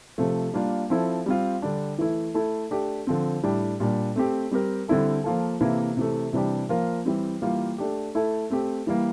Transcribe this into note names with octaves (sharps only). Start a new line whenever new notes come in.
C3 F3 A3
G3 A#3 D4 F4
F3 C4 E4 A4
G3 C4 F4
D3 G3 D4
E3 A3 E4
A3 E4 A4
A3 D4 G4
D3 F3 C4
A2 G3 D4 G4
A#2 G3 D4
A3 C4 G4
G3 C4 G4 A#4
D3 G3 C4 E4 A4
F3 A#3 F4 A4
C3 E3 A#3 E4 A4
C3 E3 A3
C3 E3 G3 D4 G4
F3 A#3 F4 A#4
E3 G3 C4
E3 G3 A#3 F4
A3 D4 G4
A3 E4 A4
A3 C4 G4
E3 G3 A#3